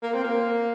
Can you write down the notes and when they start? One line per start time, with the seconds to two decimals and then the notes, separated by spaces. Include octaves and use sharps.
0.03 A#3
0.14 C4
0.24 A#3